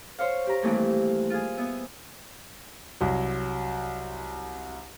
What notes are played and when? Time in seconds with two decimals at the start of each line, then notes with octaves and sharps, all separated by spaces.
0.19 C5 C#5 F5
0.47 G4 A#5
0.62 G2 D#3 E3 A3 A#3 C4
1.30 F4 G#4
1.57 B3 E5
3.01 C2 F#3